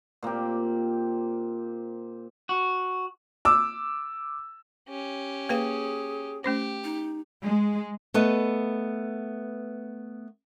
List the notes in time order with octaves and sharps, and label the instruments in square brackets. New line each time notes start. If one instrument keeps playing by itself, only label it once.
[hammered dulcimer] A#2 A#3 C4 G4
[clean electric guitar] F#4
[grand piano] D6 E6
[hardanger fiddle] C#4 G4
[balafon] A#3 B4 F5 [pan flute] G#4
[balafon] A3 C#4 C5 [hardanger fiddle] G4
[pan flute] D#4
[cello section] G#3
[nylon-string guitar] A3 B3 B4 D#5